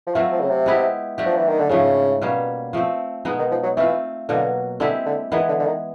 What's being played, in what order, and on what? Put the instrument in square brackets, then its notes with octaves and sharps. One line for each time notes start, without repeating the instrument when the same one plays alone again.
[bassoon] F3
[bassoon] E3 [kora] F#3 A3 C4 F4
[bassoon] F3
C#3
C3
[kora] G#3 B3 E4 G4
F#3 A3 D4 G4
[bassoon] F3
E3
D#3
D3
[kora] G#2 F3 A3 [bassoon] C#3
[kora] B2 G3 A#3 C#4
F3 A3 C4
B2 G#3 B3 D#4
[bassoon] D#3
F3
F#3
[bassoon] E3 [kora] A3 C4 F4
[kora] B2 F#3 A#3 [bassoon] D3
[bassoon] D3 [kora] G#3 C4 E4 G4
[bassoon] D3
[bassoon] D#3 [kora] E3 G#3 B3
[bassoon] D3
D3
D#3